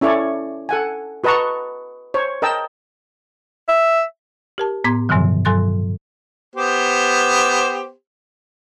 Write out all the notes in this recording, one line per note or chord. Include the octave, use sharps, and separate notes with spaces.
C#4 E4 A4 C#5 D5
A4 F#5 G#5
F#4 B4 D#5 A5 A#5 C#6
C5 C#5
A#4 D#5 G5 A5 E6
E5
G4 A#4 A5
A2 B3 C6 D6 G#6
G2 B2 D3 D#3 F3 F#3
G2 F#3 A4 C6 F#6 A6
B3 G4 C5